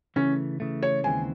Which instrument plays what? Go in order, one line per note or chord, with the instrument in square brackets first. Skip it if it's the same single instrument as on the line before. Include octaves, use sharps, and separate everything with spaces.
[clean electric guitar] C#3 E3 A3 [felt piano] C#4
[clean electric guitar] C#3 E3 A3
[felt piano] C#5
[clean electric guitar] D#2 C#3 E3 G#3 C4 [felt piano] G#5